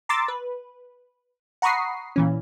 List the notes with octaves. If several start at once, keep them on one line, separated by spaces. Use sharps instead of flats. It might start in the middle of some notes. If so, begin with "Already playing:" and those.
A#5 C6 D6 E6 A6
B4
F#5 A#5 B5 C#6 D#6 C7
A#2 E3 C#4